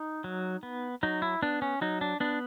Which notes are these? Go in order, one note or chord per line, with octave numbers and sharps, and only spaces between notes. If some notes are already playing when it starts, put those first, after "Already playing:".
Already playing: D#4
F#3
B3
F#3 D#4
E4
B3 D4
C#4
F#3 D#4
D4
B3 D4